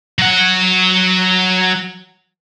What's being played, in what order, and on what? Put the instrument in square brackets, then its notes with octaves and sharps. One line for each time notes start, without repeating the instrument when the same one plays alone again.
[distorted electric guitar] F#3 F#5